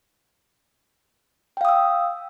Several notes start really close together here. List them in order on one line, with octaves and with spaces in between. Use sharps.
G5 F5 D#6 E6